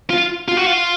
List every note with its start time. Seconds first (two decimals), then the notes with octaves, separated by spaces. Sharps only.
0.10 F4
0.48 F4
0.57 F#4
0.66 F4